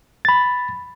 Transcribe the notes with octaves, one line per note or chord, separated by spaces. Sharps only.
B5 A6